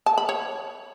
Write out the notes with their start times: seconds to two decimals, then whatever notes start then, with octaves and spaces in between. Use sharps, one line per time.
0.06 A5
0.18 B5
0.29 C#5